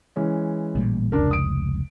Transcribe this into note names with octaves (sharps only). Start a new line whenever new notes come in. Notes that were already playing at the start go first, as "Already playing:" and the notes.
E3 G#3 C#4
A1 A#2 G3
F1 C#2 D4 A#4
D#6 D7